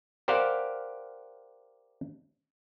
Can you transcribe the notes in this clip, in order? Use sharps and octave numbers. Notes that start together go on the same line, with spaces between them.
G4 A#4 C5 D5 F5 F#5